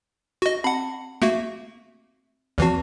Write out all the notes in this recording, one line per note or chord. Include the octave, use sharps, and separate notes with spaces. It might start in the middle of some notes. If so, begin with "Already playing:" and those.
F#4 D#5
C4 F#5 B5
A3 A#3 F#4 E5
D#2 E3 F3 C4 F#4